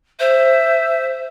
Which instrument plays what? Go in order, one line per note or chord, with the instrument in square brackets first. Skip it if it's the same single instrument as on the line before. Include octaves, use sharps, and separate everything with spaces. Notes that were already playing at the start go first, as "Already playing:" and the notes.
[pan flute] C5 [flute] E5